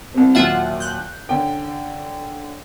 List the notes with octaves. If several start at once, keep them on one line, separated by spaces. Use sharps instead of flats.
C2 C3
D#2 A#2 F#3 F4 E5 F#5
F#6 G6
D3 C#4 G5